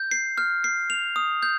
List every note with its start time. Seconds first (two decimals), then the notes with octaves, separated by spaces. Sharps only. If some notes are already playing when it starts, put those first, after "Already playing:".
Already playing: G6
0.11 C7
0.38 F6
0.64 C7
0.90 F7
1.16 D#6
1.43 G6